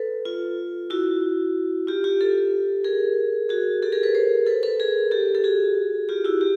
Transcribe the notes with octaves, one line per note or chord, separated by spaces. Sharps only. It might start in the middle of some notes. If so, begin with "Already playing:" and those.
Already playing: A4 B4
F4
E4 F#4
F4 G4
F4 G4
G4 A4
G#4 A#4
F#4 G#4
G4 A4
G#4 A#4
A4 B4
A#4 C5
A4 B4
A4 B4
G#4 A#4
G4 A4
A4
F#4 G#4
F4 G4
E4 F#4
G4